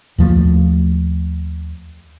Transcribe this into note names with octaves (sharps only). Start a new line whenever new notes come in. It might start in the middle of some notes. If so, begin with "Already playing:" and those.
D#2 F3 A3